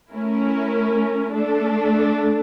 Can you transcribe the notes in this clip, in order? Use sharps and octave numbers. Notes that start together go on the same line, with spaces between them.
A3 C#4 E4 A#4
A3 D4 A4